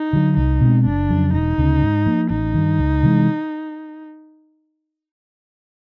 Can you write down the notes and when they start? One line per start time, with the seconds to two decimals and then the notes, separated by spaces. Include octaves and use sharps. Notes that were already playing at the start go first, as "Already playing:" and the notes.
Already playing: D#4
0.13 D3 F#3
0.37 C2 D#4
0.61 B2 G#3 C4
0.85 F#1 D4
1.09 F2 C#3 F#3
1.33 E1 D#4
1.58 D2 C#3
1.82 G#2
2.06 F3 A#3
2.30 A1 D#4
2.54 G2 D#3
2.79 C#2
3.03 C3 E3 G#3